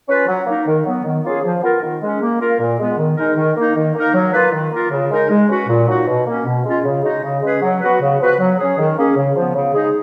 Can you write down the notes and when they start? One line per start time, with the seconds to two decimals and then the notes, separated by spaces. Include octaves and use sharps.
0.08 C#4 F4 B4
0.28 F#3
0.46 A#3 D#4 A#4
0.66 D#3
0.85 F#3 B3
1.04 D#3
1.24 A#3 C#4 F4 G#4
1.44 F3
1.63 B3 F4 A#4
1.82 D#3
2.02 G#3 C#4
2.21 A#3
2.40 F4 A#4
2.60 A#2
2.79 G#3 B3
2.98 D#3
3.17 G#3 D#4 A#4
3.37 D#3
3.56 A#3 D#4
3.75 D#3
3.95 A#3 D#4 A#4
4.14 F#3
4.33 A#3 F4 B4
4.52 D#3
4.71 A#3 F4 A#4
4.91 C#3
5.11 G#3 D#4 A#4
5.30 G#3
5.49 C#4 F#4 B4
5.68 A#2
5.87 F#3 A#3 D#4 F#4
6.07 B2
6.26 A#3 C#4
6.46 B2
6.65 G#3 C#4 F4
6.84 C#3
7.03 G#3 D#4 F#4
7.23 C#3
7.42 G#3 C#4 G#4 B4
7.62 F#3
7.81 B3 F#4 B4
8.00 C#3
8.20 F3 B3 F#4 B4
8.39 F#3
8.58 C#4 G#4
8.78 D#3
8.97 A#3 C#4 G#4
9.16 C#3
9.35 F3 B3
9.55 C#3
9.74 G#3 D#4 G#4